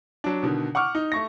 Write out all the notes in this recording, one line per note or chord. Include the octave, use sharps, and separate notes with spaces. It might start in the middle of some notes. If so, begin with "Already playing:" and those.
F#3 D4
B2 D3 D#3
F#5 C#6 D6 F6
D#4
A3 C#6 A#6